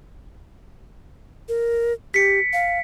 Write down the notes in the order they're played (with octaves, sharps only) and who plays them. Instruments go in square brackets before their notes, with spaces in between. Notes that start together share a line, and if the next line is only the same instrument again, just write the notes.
[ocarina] A#4
[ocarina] G4 [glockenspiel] B6 C#7
[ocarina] F5